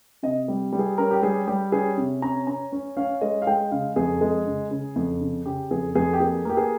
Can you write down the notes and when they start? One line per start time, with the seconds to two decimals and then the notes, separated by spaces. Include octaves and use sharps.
0.23 C3 D#5
0.48 G3
0.73 G3
0.79 G#4
0.98 C#4 A#4
1.11 G4
1.22 G3 G#4
1.47 G3 G4
1.72 C#4 G#4
1.98 C3
2.22 C#4 A#5
2.47 C#4 A#5
2.72 C#4
2.97 C#4 F5
3.21 G#3 D#5
3.42 F5
3.47 G#3 G5
3.71 C#3 F5
3.96 F2 G#4
4.21 G#3
4.46 C#3
4.71 C#3
4.96 F2
5.21 C#3
5.46 C#3 G4
5.71 F2 G#4
5.95 F2 G#4
6.13 G4
6.20 A#3 G#4
6.45 A#3 G4
6.57 G#4